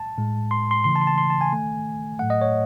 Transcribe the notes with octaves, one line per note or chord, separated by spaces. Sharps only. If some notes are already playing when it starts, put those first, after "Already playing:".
Already playing: A5
A2 G#3
C6
C6
C#3 E3 A3 C6
A5
C6
A5
C6
A5
G#5
D#3 A3
A2 F#3 A3 F#5
D#5
C#5